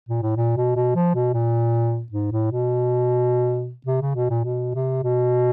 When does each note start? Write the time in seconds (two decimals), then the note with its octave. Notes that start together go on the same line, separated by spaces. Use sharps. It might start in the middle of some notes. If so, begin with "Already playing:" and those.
0.09 A#2
0.23 A2
0.37 A#2
0.57 B2
0.76 B2
0.96 F3
1.15 B2
1.34 A#2
2.12 G#2
2.32 A2
2.51 B2
3.86 C3
4.02 C#3
4.16 B2
4.30 A#2
4.44 B2
4.75 C3
5.04 B2